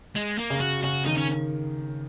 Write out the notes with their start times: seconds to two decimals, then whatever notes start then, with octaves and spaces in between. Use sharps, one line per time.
0.16 G#3
0.39 A#3
0.50 C#3
0.61 F#4
0.84 C#3 F#4
1.06 D#3 D#4
1.18 C#4